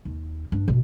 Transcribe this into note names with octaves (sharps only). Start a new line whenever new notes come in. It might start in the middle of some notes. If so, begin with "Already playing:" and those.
D#2
G2 D4
A1 B2